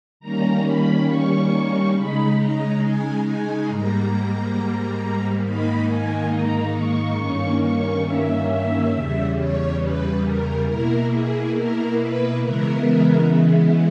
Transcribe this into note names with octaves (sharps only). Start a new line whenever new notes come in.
D#3 G3 A#3 C#4 A#5
B5
C#6
C#3 G#3 D#4 B5
A#5
G#5
G#5
G#2 G3 A#3 A#5
G#2 D#3 A#3 D#4 B5
G#5
A#5
C#6
G2 D#3 A#3 C#4
C#6
E5
E5
E2 C#3 G3
C#5
B4
A#4
B2 A#3 E4 A#4
G#4
A#4
B4
C#3 E3 G#3 B3 E4 A#4
A#4